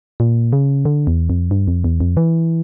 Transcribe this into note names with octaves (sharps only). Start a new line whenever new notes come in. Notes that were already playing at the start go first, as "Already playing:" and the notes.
A#2
C#3
D3
E2
F2
G2
F2
E2
F2
E3